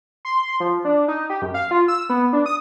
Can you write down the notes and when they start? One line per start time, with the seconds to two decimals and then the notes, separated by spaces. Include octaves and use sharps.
0.25 C6
0.60 F3
0.85 D4
1.08 D#4
1.30 G4
1.42 F#2
1.54 F5
1.71 F4
1.88 E6
2.09 B3
2.33 D4
2.46 D#6